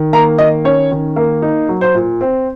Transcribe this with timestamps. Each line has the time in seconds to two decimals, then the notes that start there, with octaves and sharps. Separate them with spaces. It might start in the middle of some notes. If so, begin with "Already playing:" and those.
Already playing: D#3
0.13 A#3 A#5
0.38 D#3 D#5
0.64 C#4 C#5
0.91 D#3
1.16 A#3
1.42 D#4
1.69 F#3
1.81 C5
1.95 A#2
2.21 C4